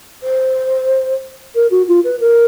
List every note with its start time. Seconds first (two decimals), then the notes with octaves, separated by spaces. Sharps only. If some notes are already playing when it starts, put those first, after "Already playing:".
0.23 C5
1.55 A#4
1.70 F#4
1.88 F4
2.04 B4
2.20 A#4